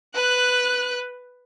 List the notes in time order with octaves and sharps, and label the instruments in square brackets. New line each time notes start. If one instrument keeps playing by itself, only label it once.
[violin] B4 F#6